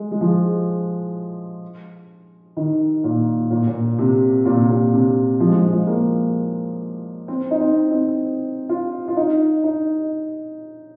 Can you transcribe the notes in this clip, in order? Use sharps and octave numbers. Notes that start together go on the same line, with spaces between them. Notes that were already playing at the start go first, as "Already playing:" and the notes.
Already playing: G#3
G#3
F3
D#3
A#2
A#2
A#2
C3
A#2
C3
A#2
C3
F3
G#3
F3
G#3
F3
A#3
C4
D#4
C4
C4
F4
F4
D#4
D#4